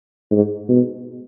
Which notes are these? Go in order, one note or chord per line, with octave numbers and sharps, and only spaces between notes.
G#2
B2